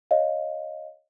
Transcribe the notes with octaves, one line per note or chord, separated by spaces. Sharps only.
C#5 D#5 F5